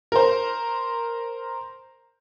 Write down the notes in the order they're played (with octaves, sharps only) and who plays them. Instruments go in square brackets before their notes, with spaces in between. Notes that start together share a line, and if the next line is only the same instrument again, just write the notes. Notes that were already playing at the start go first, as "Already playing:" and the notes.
[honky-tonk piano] A#4 C5